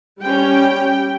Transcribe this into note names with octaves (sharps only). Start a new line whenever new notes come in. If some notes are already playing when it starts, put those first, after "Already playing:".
G3 C#4 G4 G5